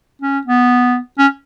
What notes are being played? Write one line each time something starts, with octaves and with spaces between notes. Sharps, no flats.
C#4
B3
C#4